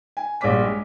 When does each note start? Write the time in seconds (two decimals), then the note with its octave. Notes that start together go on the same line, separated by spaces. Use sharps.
0.17 G#5
0.41 A#1 G2 C#5 D6 B6
0.63 G#3